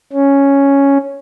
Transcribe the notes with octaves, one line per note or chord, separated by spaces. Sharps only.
C#4